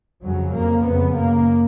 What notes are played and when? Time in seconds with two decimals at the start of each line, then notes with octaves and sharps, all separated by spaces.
0.22 F2 C#3 F#3
0.53 F2 C#3 A#3
0.85 F2 C#3 B3
1.16 F#2 C#3 A#3